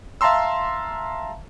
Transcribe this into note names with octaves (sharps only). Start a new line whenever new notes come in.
E5 F5 A5 A#5 C6 E6